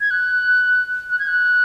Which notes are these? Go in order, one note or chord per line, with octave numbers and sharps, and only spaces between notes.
G#6
F#6
F#6
G#6
F#6